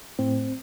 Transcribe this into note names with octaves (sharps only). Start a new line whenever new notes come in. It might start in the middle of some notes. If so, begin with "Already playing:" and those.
A2 C4